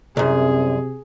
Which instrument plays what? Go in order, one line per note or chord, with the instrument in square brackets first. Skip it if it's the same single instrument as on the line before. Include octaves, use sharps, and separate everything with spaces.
[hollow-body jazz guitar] C2 F#2 [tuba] C3 [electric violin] G#4